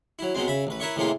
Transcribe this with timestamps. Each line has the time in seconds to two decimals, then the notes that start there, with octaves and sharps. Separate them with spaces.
0.19 F#3 E4
0.35 B2 F#3 G#3 C4
0.48 C#3 E5 B5
0.67 A1 B4
0.80 E4 A#4 B4 C#5 E5 C#6
0.96 A2 C3 E3 G#3 A#3 F4